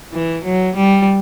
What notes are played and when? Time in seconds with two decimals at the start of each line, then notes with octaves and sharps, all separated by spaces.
0.13 E3
0.44 F#3
0.76 G3